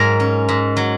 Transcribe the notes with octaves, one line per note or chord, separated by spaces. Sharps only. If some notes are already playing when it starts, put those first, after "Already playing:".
Already playing: G#2 F#3 G#4 A#4
C#4
G#2
F#3